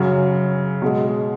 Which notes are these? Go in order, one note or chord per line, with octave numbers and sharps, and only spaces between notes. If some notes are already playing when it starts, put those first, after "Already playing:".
Already playing: F#2 C#3 F#3
B2 G#3